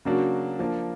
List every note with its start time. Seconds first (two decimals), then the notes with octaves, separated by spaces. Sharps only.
0.05 C#3 F#3 A#3 D4 F#4
0.59 F3 A#3 D4